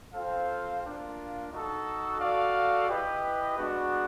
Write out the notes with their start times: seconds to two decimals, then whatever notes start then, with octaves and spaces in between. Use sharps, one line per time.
0.14 C4 F4 A4 C5 F5
0.82 A#3 D4 F4
1.50 D#4 F#4 A4
2.19 F#4 A4 D5 F5
2.88 E4 G4 B4 D#5
3.57 G#3 B3 D4 F#4